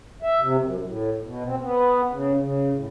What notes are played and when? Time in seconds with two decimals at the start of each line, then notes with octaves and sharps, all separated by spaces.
0.22 E5
0.41 C3
0.61 F#2
0.84 A2
1.23 B2
1.46 C4
1.61 B3
2.11 C#3
2.38 C#3
2.72 A2